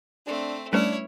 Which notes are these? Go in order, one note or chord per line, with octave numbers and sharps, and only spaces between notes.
A3 C4 D4
G3 A3 C#4 D4 E4 B4 C#5